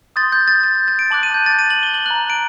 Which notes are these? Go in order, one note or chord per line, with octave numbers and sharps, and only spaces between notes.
C6 D#6 G6 A6
G6
A6
A6
G6
A6
D7
A5 D6 F#6 F#7
D#7
G6
A6
D#7
F#7
G7
F#7
A#5 F#6 F#7
D7